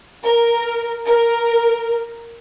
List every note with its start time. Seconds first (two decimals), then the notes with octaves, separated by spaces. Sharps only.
0.23 A#4
1.05 A#4